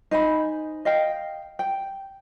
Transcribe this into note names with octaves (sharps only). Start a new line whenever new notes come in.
D#4 C5 G#5 B5
D#5 F5 G5
G5